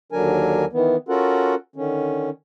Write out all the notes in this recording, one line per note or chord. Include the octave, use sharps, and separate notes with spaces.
D#2 D3 F#3 D4 A#4 G#5
D#3 E3 B3
C#4 F4 F#4 A4 A#4 F#5
D3 D#3 C#4